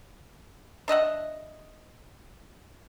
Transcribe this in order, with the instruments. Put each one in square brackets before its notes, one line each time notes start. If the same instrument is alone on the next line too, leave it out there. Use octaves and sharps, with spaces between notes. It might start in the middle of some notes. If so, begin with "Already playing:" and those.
[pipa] D4 D#5 E5 F#5